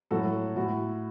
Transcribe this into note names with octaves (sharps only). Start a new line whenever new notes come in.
A2 F#3 F#4 A4
A2 F#4